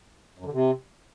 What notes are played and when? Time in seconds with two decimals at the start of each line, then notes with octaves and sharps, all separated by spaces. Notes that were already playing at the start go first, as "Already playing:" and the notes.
0.39 F#2
0.46 D3
0.53 C3